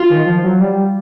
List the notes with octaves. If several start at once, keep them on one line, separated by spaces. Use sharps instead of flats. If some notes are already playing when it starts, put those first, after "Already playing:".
Already playing: F4
D#3
F3
F#3
G3